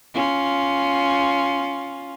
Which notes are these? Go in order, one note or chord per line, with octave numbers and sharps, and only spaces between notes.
C#4 F4